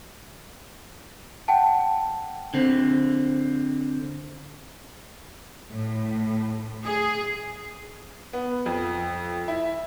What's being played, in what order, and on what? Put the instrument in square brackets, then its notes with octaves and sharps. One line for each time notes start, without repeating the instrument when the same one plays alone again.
[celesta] F#5 G5 A5
[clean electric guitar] D3 C4
[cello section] A2
G#4
[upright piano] B3
F2
E4